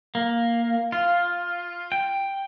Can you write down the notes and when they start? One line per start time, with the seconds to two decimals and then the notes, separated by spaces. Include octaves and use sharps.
0.15 A#3
0.92 F4
1.92 G5